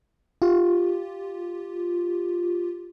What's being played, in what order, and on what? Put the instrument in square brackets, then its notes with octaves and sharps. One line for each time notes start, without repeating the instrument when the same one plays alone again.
[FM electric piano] F4 G4